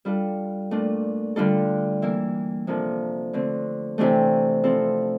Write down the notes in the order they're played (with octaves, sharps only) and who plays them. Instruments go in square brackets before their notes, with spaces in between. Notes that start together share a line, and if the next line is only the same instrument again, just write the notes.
[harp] G3 D4 F4 A4
A#2 A3 D4
D3 G3 D4 F4 A4
E3 A#3 E4
C3 F3 A#3 D4 A4
D3 A3 C4
C3 E3 A3 D4 G4
F3 C4 E4 A4